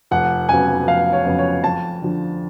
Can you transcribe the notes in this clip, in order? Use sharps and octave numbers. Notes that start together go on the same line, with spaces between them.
F1 F#5
F2 C#3 F#3 B3 G#5
F1 F5
C#5
F2 C#3 F#3 B3
C#5
F2 A5
D3 F3